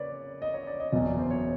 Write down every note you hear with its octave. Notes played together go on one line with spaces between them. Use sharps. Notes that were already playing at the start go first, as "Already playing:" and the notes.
Already playing: C#3 A#3 B4 C#5 D5
D#5
C#5
D5
D#5
F#1 E2 B2 F#3 D#5
D5
C5
C#5